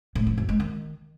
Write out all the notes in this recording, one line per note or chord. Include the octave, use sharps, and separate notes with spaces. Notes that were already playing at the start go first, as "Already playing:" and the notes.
A2
F3
F#2
G#3
D#3